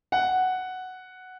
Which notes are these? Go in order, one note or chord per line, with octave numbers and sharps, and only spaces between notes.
F#5